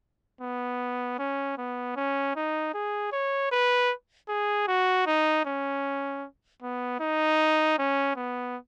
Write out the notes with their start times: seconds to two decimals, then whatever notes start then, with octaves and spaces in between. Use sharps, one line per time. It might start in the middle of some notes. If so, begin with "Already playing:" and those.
0.41 B3
1.19 C#4
1.58 B3
1.96 C#4
2.36 D#4
2.74 G#4
3.12 C#5
3.52 B4
4.29 G#4
4.67 F#4
5.07 D#4
5.45 C#4
6.62 B3
7.00 D#4
7.79 C#4
8.16 B3